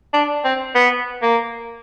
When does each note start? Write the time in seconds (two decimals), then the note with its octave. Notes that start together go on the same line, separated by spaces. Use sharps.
0.14 D4
0.44 C4
0.75 B3
1.22 A#3